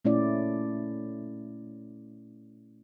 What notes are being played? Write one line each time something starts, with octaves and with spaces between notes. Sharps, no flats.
A#2 A3 C#4 E4 D5